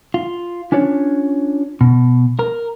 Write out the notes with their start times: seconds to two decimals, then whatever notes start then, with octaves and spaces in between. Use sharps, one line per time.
0.14 F4
0.72 C#4 D4 F4 C#5
1.81 B2
2.39 A#4